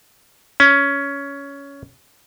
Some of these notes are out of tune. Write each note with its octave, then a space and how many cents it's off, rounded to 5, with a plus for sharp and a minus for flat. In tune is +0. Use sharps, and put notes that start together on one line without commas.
C#4 +15